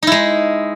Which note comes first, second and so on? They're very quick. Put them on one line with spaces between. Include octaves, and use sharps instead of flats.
D#4 E4 G#3